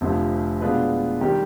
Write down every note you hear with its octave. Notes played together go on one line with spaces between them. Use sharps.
F1 F2 D3 F3
B2 G#3 D4 F4 B4
D#3 G3 C4 G4